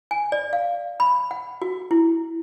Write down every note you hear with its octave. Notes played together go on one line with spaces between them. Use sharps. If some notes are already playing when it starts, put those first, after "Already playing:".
G#5
D5
F5
B5
F#5
F#4
E4